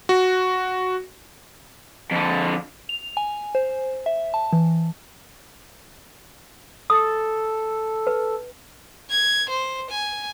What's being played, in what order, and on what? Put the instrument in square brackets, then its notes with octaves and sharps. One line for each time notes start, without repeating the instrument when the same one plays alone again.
[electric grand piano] F#4
[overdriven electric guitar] F2 D3
[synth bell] F7
G#5
C5
E5
A5
E3
[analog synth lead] A4 [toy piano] D#6
[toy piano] B4
[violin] G#6
C5
G#5